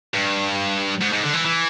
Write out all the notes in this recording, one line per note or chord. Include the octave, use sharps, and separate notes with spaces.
G2
G#2
G#2
D3
E3
E3